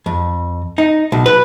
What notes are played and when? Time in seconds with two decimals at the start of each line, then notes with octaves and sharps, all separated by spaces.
0.06 F2
0.78 D#4
1.12 B1
1.26 B4